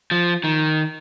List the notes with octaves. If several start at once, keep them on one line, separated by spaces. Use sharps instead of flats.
F3
D#3